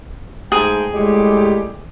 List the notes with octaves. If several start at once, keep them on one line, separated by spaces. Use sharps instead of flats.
G#2 A3 G#4 G5
A2 G3 G#3 G4